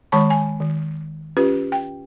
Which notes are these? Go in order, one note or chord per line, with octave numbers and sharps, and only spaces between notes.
D#3 G#3 C#5 A5 B5 C#6
G#5
D#3
C#4 F4 G4 B4
G5